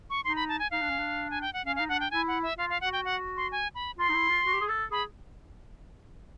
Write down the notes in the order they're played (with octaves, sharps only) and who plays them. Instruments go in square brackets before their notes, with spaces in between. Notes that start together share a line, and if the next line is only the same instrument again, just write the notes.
[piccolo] C#6
[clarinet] D#4 [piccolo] C6
[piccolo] B5
A5
G#5
[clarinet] D#4 [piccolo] F5
[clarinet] D4
C#4
D4
[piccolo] G#5
G5
F#5
[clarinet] C#4 [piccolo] F5
[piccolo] F5
[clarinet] D#4
[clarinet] D4 [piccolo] F#5
[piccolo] G5
[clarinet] E4 [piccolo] G#5
[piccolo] F#5
E5
[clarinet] F4 [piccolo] F5
[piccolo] F5
[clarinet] F#4 [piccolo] F#5
[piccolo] G5
F#5
C6
G#5
B5
[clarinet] F4 [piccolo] C6
[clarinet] D#4
E4
F4
F#4
G4
G#4
A4
[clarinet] G#4 [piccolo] B5